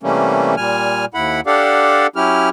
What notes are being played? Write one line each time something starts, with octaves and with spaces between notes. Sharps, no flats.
C3 E3 G3 A3 A#3 C#4
A#2 G3 G#5 F6
D#2 E4 F#5 B5
D4 G4 A4 D5 F5 F#5
F#3 C#4 E4 G4 F6